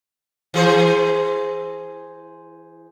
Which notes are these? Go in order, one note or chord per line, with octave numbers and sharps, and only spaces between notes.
E3 G#4 C5